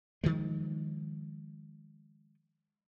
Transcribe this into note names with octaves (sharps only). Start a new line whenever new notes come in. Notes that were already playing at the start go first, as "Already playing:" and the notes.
D#3 F3 G#3